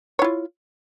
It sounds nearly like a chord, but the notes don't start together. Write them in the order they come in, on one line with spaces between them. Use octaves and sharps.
C#5 E4 F4